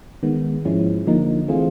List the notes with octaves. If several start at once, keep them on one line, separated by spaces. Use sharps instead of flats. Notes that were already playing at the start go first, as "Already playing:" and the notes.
D#3 G#3 B3
G#2 F3 G#3 C#4 E4
D3 F3 A#3 D#4
E3 A3 C4 F4 G#4